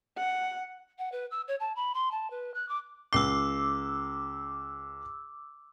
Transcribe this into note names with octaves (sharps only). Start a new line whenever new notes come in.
F#5
F#5
B4
E6
C#5
A5
B5
C6
A5
B4
F#6
D6
C#2 D6 E6 C7